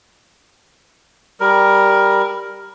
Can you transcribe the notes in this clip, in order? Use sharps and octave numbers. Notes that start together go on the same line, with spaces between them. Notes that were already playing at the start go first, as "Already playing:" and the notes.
G3 A#4